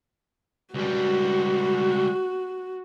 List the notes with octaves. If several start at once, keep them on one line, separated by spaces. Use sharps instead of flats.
C#2 G3 F#4